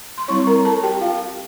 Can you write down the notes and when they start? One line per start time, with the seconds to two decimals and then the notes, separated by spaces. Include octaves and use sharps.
0.18 C6
0.28 G3 C4 E4 C#5 C#6
0.47 A#4 A#5
0.65 A4 A5
0.83 G4 G5
1.01 F4 F5